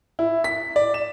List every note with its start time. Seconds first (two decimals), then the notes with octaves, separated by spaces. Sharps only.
0.19 E4
0.44 B6
0.76 D5
0.94 E7